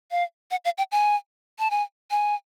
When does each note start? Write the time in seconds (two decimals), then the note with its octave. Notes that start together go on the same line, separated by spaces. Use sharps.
0.11 F5
0.51 F#5
0.65 F5
0.78 G5
0.92 G#5
1.59 A5
1.71 G#5
2.11 G#5